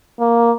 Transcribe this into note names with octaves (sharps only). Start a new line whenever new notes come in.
A#3